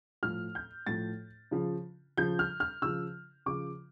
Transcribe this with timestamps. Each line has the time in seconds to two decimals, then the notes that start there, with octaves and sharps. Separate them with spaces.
0.23 A2 F3 F6
0.55 G6
0.87 A2 F3 A6
1.51 C#3 F3
2.17 C#3 F3 G6
2.39 F6
2.60 F6
2.82 C#3 F3 E6
3.46 C#3 F3 D6